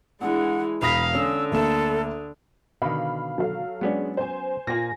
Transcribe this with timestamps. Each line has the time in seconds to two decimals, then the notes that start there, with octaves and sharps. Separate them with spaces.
0.21 E3 G#3 D4 F#5
0.82 E1 F5 B5 D#6 A#6
1.14 D3 C#4 E6
1.52 D2 A#3 A4 E7
2.82 B2 D3 D#3 F5 B5
3.38 F#3 A4 F5
3.81 F#3 G#3 B3 C#4 D4
4.17 C5 G#5
4.67 A#2 A#3 F4 G#5 A#6